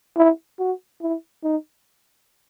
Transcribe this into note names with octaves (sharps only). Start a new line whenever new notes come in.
E4
F#4
E4
D#4